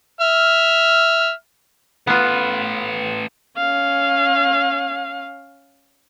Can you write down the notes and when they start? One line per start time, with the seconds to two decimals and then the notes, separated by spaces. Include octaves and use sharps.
0.21 E5 F6
2.07 A3 B3 F4 B4
3.57 C#4 F5